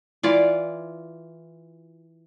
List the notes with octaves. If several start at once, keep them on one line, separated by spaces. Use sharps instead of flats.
E3 F4 D5